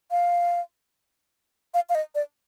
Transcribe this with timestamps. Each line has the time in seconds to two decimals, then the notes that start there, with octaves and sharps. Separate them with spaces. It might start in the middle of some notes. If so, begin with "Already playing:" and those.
0.11 F5
1.74 F5
1.89 F5
1.95 D#5
2.15 D5